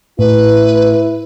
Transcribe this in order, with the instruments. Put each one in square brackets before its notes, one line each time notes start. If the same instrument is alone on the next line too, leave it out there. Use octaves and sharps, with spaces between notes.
[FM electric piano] A2 [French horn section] E4 [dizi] B4